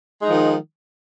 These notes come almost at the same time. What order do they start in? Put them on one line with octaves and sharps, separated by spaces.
G#3 D#4 F3 D#3